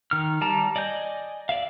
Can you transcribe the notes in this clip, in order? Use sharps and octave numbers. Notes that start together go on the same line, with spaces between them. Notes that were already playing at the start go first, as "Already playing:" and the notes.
D#3 F6
G3 A5 A#5
D5 D#5 G#5 G6
D5 E5 F5